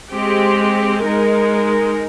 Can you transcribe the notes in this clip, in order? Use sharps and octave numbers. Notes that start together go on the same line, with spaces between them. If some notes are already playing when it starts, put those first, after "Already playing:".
G#3 C4 G4
G#3 D#4 A#4